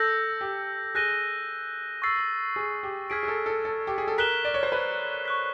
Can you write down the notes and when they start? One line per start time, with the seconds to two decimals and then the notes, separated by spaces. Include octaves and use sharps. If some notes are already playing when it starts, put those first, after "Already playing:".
Already playing: A4 E6 G6 A#6
0.41 G4
0.95 G#4 F#6 A#6 D#7 G7
2.02 C#6 E6 A6 C7
2.56 G#4
2.83 G4
3.10 G#4 F6 G#6 B6 D7
3.23 G#4
3.28 A4
3.46 A4
3.65 A4
3.87 G4
3.98 G#4
4.08 A4
4.18 A#4 F#6 B6 E7 G7
4.45 D5
4.54 C#5
4.63 C5
4.72 B4
5.25 C#6 F#6 B6